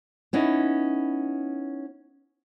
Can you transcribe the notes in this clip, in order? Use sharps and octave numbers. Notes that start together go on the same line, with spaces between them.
B3 C#4 D#4 E4